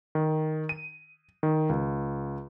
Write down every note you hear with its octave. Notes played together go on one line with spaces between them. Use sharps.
D#3
D#7
D#3
C#2